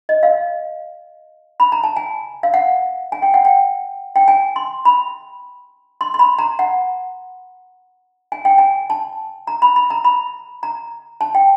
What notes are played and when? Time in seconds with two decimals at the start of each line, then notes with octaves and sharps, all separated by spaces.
0.09 D#5
0.23 F5
1.60 B5
1.72 A#5
1.84 A5
1.97 G#5
2.43 F5
2.54 F#5
3.12 G#5
3.22 G5
3.34 F#5
3.45 G5
4.16 G5
4.28 G#5
4.56 C6
4.85 B5
6.01 C6
6.14 C6
6.19 B5
6.39 A#5
6.59 F#5
8.32 G#5
8.45 G5
8.58 G#5
8.90 A5
9.47 A#5
9.62 B5
9.76 B5
9.90 A#5
10.04 B5
10.63 A#5
11.21 A5
11.35 G5